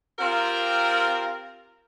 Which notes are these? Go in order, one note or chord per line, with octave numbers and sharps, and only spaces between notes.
C4 F4 G4 A#4